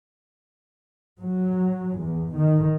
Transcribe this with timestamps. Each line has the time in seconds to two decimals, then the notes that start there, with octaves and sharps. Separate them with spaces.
1.19 F#3
1.97 E2
2.34 D#3